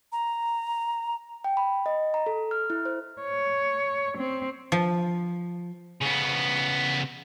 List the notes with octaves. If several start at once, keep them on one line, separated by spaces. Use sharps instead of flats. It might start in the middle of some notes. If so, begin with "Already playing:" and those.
A#5
G5
B5
D#5
A#5
A4
F6
E4
C5
C#5
C4
F3
C#3 B3